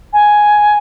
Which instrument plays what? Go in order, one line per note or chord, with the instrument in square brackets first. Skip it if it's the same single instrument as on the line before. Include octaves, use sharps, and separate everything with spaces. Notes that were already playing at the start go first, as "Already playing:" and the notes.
[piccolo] G#5